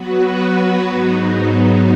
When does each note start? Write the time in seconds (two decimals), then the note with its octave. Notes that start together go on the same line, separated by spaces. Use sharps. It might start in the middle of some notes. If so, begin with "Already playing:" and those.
Already playing: F#3 B3 F#4 B4
0.88 G#2 F#3 B3 D#4